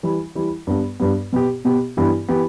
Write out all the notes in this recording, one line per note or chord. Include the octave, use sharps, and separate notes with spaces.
E3 G3 E4
E3 G3 E4
G2 G3 B3
G2 G3 B3
B2 B3 G4
B2 B3 G4
G2 E3 B3 E4 G4
E3 B3 E4 G4